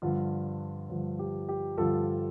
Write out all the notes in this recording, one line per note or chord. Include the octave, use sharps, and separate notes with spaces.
G2 D3 F3 F4
G2 D3 F3
G4
G4
G2 D3 F3 F4 A4